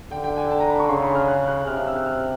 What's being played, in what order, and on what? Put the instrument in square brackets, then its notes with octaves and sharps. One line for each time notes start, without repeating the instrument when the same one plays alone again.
[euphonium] D3 [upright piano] G5
[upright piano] G5
G#5
A5
A#5
B5
C#6
[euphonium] C#3 [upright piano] C6
[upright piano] B5
F6
F#6
F#6
[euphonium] C3 [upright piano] F6
[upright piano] F6
E6
F#6
F6